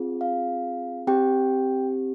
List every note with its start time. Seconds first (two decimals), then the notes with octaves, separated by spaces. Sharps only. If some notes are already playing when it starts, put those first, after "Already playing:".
Already playing: C4 F4 G#4
0.21 F5
1.07 C4 G4 G5